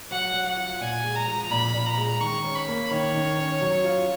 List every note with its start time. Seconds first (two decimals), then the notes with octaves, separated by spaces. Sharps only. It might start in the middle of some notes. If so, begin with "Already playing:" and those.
0.11 F#3 F#5
0.34 F#3
0.45 F#5
0.57 F4
0.80 A#2 G#5
1.04 G#3
1.16 A#5
1.27 F3
1.51 A#2 B5
1.73 A#2
1.86 A#5
1.98 G#3
2.21 D#3 C#6
2.44 C#4
2.55 B5
2.68 A#3
2.90 D#3 C#5
3.14 D#3
3.37 C#4
3.61 F#3
3.84 F4